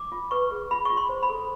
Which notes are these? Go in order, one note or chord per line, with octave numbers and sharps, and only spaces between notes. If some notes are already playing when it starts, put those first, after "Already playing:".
Already playing: D6
F4
B4 C#6
G#4
F4 B5
F4 C#6
C6
C5
B5
A4